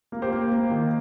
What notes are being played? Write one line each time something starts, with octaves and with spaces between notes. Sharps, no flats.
A#3
G4 C5
A#3
A#3
D#3